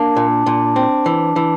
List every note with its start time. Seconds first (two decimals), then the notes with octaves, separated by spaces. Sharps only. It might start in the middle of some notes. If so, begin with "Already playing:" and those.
Already playing: A#3 D4
0.16 A#2
0.46 A#2
0.76 C4
1.06 E3
1.36 E3